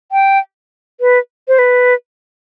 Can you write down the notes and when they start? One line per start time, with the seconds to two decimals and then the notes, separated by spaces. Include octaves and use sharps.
0.12 G5
1.01 B4
1.48 C5
1.59 B4